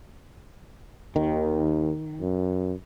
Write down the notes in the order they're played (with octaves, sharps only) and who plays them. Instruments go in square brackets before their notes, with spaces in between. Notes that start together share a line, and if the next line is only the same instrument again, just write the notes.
[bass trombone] D#2 [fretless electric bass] D#3
[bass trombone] F#2